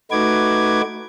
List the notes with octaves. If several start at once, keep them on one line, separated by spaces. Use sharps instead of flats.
A3 D#4 F#4 B4 D6 G#6